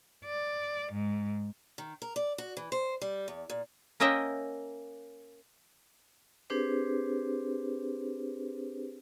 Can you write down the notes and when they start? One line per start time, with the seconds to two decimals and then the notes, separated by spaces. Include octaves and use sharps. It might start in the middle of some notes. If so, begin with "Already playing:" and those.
0.25 D5
0.92 G#2
1.78 D#3
2.02 A#4
2.16 D5
2.38 F#4
2.57 E3
2.72 C5
3.01 G3
3.28 E2
3.50 A#2
4.00 A#3 C#4 A#4 D#5 E5 G5
6.50 C4 D4 G4 G#4 B4 C5